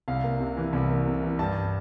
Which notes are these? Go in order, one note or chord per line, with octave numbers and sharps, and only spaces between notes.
C2 F5
A#3
C3
E3
C2
A#3
C3
E3
G2 A5